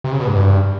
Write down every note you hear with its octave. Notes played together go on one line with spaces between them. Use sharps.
C3
C#3
B2
G#2
G2